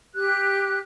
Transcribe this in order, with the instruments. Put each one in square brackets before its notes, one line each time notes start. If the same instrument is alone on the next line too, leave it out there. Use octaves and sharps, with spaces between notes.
[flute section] G4 F#6